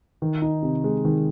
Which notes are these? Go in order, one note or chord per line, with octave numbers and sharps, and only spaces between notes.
D#3
D#4
C3
G#3
D#3